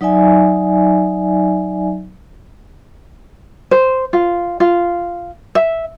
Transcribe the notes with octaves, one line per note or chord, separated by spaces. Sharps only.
F#3 D#4 D5 E5 G#5
C5
F4
F4
E5